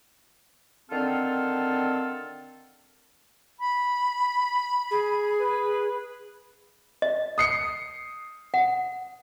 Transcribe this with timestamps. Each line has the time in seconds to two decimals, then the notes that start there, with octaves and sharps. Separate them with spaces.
0.90 D3 D#3 C4 F4 A4
3.60 B5
4.91 G#4
5.39 B4
7.02 D#5
7.38 D#6 C7 C#7
8.54 F#5